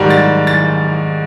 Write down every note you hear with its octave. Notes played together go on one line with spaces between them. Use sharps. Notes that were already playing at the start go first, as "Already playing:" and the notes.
Already playing: G#2 D#3 G3
A6
A6